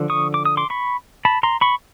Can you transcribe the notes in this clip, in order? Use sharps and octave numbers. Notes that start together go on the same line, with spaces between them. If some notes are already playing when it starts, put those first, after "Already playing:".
Already playing: D3 F3
C#6 D#6
D6
D#6
C6 D6
B5 C#6
A5 B5
A#5 C6
B5 C#6